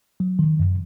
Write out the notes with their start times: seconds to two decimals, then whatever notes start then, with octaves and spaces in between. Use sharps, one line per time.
0.20 F#3
0.39 D#3
0.59 F#2